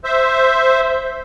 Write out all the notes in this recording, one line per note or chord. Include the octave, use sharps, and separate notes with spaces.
C5 E5